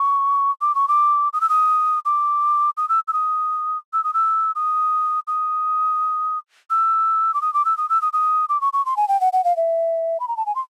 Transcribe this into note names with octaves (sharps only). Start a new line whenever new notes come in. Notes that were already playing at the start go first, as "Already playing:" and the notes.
Already playing: C#6
D6
C#6
D6
D#6
E6
D#6
D6
D#6
E6
E6
D#6
E6
D#6
E6
D#6
D#6
E6
D6
D#6
D6
E6
D#6
E6
D#6
D#6
D6
C#6
C#6
C6
G#5
G5
F#5
F#5
F5
E5
B5
A#5
A5
G#5
C6